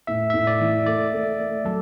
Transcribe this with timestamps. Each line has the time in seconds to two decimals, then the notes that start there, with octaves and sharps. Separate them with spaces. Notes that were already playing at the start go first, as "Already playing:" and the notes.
0.07 A2 E5
0.30 A2 E5
0.47 D5
0.60 E3
0.86 A3 D5
1.13 A3
1.39 A3
1.65 F#3 A4